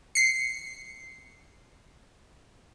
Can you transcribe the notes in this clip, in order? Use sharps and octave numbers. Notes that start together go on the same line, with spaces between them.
C7 C#7